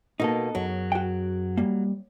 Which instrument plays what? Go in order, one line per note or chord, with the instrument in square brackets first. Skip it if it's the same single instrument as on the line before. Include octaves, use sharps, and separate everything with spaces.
[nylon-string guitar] B2 A#3 [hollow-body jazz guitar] D#4 A4
[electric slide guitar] F#2 G#4 A#4 [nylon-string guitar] F#3
[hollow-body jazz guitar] F#4 G5
G3 A#3